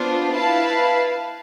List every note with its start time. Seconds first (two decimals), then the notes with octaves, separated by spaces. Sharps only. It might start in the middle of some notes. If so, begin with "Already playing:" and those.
Already playing: B3 D4 F4 C5
0.32 E4 B4 F5 A5